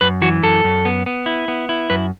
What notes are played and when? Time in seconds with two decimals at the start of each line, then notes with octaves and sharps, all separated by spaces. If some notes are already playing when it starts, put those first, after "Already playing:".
0.01 F#2 B4
0.22 E3 F#4
0.43 F#2 A4
0.64 F#2
0.85 B3
1.06 B3
1.26 E4
1.48 B3
1.69 E4
1.90 F#2 B4